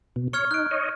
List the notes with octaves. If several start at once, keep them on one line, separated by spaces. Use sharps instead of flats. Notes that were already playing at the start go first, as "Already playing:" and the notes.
B2
C#5 C#6 F6 G#6
D#4 F#6 D7
C#5 D#5